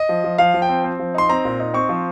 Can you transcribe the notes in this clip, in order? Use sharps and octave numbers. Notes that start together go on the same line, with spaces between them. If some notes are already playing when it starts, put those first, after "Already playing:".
Already playing: D#5
F3
F3
F3 F5
F3
G5
C4
C4
F3
D#4 C6
C4 A#5
A#2
D#4
C4 C#6
F3